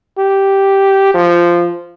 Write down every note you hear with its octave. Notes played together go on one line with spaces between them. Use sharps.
G4
F3